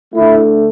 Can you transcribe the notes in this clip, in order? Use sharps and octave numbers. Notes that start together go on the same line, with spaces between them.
D3 A3 E4